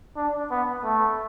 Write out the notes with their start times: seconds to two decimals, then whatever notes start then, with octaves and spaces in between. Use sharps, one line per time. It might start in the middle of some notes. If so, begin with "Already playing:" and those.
0.17 D4
0.51 B3
0.84 A3